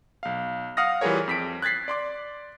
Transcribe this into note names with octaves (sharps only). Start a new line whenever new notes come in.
B1 F5
F5 F#5 D#6 F6 A#6
E3 G3 F4 G#4 A#4 C#5
F2 B6 D7
F#6 G#6 A6 B6 C7
D5 C6 D6